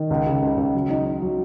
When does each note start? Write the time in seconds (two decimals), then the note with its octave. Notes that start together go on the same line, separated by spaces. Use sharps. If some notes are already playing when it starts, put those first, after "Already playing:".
Already playing: D#3
0.10 C#2
0.26 C#3
0.42 C#2
0.57 C#2
0.74 F#3
0.90 D#4
1.06 D#4
1.22 F#3